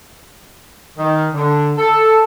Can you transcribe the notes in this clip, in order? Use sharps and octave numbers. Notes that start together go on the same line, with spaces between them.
D#3
D3
A4